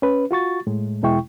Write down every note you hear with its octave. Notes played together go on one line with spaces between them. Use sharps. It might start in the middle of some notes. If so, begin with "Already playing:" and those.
C#4 B4
F4 F#4 C#6 A6
A2 G#3
E2 B2 G#3 E4 G5 C#6